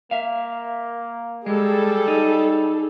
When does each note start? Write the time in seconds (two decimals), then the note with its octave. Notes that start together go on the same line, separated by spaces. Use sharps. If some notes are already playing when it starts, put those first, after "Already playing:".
0.11 A#3 E5 F5
1.46 G3 G#3 G#4 A4
2.08 D#4